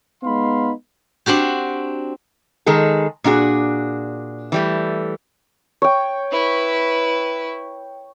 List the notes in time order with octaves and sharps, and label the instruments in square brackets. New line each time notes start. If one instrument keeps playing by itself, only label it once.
[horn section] G#3 B3 D#4 F5 B5 C6
[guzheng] C4 D4 F#4 G4
[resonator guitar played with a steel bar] D#3 G#3 G#4 A4
A#2 D4 F#4 G#4
E3 G3 A3
[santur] C#5 G5
[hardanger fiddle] E4 B4